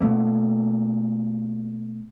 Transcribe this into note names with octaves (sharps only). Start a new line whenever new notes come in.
B2 A3 A#3